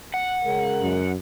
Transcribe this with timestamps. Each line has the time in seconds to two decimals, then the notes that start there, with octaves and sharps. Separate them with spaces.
0.14 F#5
0.44 C#3 G#3 A#4
0.82 F#2